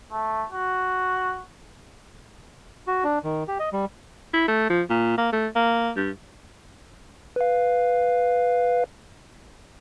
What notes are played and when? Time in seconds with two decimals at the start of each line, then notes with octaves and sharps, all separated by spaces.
0.12 A3
0.52 F#4
2.87 F#4
3.04 D4
3.24 D#3
3.48 G4
3.60 D#5
3.73 G3
4.33 E4
4.48 A3
4.70 F3
4.90 A#2
5.17 A#3
5.33 A3
5.55 A#3
5.96 G2
7.36 B4 F5